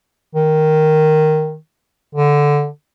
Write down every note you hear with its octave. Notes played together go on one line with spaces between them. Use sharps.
D#3
D3